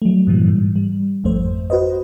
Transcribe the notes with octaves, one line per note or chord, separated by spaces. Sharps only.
F#3 A3
G2 A#2 E3 G3
G#2
G3
G#1 F2 A3 C5
F#4 B4 C5 D#5